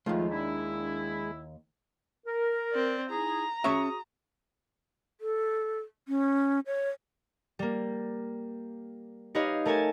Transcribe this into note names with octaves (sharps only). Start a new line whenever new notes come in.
D#2 D#3 F3 G#3 A3 F4
D4 E4
A#4
C4 D5
D#4 E4 G#4 A#5
C#4 F#4 G#4 C#5 E5 D#6
A4
C#4
C#5
G3 A#3
D#4 G4 B4 C#5 D#5 F5
A3 A#4 C#5 G#5 A5